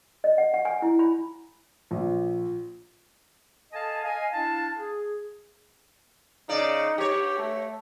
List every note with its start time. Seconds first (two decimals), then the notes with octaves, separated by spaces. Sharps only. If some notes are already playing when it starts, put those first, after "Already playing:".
0.24 D#5
0.38 F#5
0.54 F#5
0.65 G#5
0.82 E4
0.99 B5
1.91 A#1
3.73 A4 D#5 F5 G#5 A5
4.03 D#5 F5 G#5
4.32 D4 E4 F5 A5
4.76 G#4
6.49 C#3 D#4 D5
6.98 G2 G4 C#5
7.38 A3